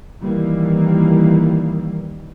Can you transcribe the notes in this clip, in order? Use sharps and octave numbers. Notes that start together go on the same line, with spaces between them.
D#3 E3 G3 A#3